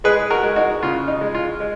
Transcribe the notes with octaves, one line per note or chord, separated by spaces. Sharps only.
G#3 G#4 B4
F#4 A#4
G#3
D#4 F#4
C#3 F4
D#4
G#3
F4
G#3